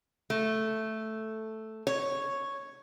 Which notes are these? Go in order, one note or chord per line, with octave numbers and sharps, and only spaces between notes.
A3
C#5